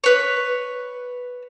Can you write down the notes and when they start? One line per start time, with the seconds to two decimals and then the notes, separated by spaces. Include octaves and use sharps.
0.04 B4 C#5